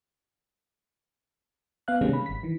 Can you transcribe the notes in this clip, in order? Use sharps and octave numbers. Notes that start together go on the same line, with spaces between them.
B3 F5 F#6
C3 D#3 G3 G#3 A#3 C#4
B5
G#1 B6
D#3 E3